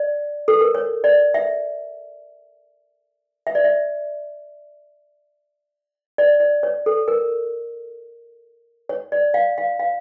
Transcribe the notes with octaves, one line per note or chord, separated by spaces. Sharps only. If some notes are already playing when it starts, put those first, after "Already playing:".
Already playing: D5
A4
A#4
C#5
D5
E5
E5
D5
E5
D5
D5
C#5
A4
A#4
C#5
D5
F5
F5
F5